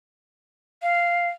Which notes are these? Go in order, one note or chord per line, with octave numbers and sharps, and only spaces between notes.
F5